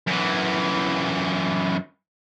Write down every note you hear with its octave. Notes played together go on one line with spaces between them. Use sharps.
F#2 E3